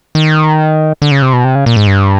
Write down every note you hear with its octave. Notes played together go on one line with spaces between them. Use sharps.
D#3
D3
C#3
C3
B2
C3
C#3
A#2
G#2
G2